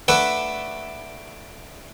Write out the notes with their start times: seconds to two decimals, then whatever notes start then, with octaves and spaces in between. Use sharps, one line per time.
0.08 A3 D4 B4 E5 F#5